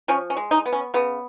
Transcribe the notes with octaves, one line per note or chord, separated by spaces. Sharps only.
F3 C#4
C#4
G#3
D#4
B3
C#4
C#3 B3